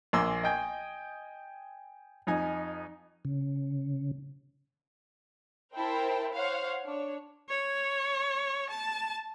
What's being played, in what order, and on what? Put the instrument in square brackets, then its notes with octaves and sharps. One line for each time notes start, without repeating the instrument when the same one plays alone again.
[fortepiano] A#1 A#3 G#5 C6 D6 E6
D#5 G5 G#5
F2 D#4 G#5
[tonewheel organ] C#3
[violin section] E4 A#4 C5 G5 A5
C5 C#5 F5 F#5
D4 C#5
[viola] C#5
A5